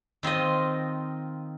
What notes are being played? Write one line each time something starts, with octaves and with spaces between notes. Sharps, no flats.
D#3 C4 F4 D#5